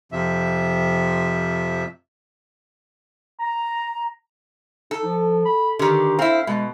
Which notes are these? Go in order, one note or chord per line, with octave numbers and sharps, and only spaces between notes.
F2 C3 F3 E5
A#5
D#4 A4
F3
B5
D3 D#3 G4
C4 E4 F5
B2 G#3